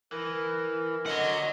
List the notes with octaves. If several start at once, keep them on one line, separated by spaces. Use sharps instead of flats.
E3 A#4
D3 C#5 D#5 F#5